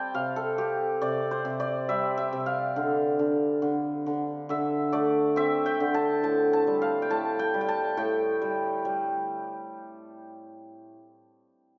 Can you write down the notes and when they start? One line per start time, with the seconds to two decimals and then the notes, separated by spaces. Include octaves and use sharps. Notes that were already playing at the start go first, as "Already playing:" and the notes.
Already playing: G3 C4 D5 G5 A5
0.14 C3 F5
0.36 A4
0.58 C4 G4
1.02 C3 D5
1.31 C5
1.45 C3
1.60 D5
1.89 G3 E5
2.18 E5
2.33 C3
2.46 F5
2.76 D3
3.19 D3
3.62 D3
4.06 D3
4.49 D3 E5
4.93 A3 D5
5.36 C4 E5
5.66 G5
5.80 D3
5.94 A5
6.23 A2 A5
6.53 A5
6.67 G3
6.82 F5
7.02 G5
7.10 A2 A5
7.39 G5
7.54 G3
7.61 G5
7.68 A5
7.97 A2 G5
8.42 G3
8.85 G3